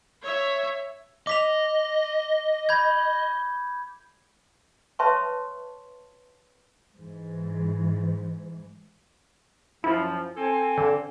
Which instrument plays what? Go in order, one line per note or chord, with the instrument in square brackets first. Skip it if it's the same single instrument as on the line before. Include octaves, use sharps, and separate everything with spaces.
[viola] C#5 E5
[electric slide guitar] D#5 [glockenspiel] D6 B6 F7
[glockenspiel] B5 G6 G#6
[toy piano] B4 C#5 E5 A5 C6 C#6
[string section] G#2 E3
[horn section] F#2 F3 [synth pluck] E4
[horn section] C4 A4 G#5
[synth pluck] D3